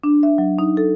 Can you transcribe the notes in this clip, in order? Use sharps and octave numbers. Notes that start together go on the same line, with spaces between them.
D4
E5
F#3
D#4
A4